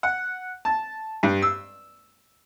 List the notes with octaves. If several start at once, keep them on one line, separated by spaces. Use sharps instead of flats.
F#5
A5
G2
E6